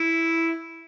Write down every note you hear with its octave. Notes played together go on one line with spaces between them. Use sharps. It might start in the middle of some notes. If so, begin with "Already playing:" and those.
Already playing: E4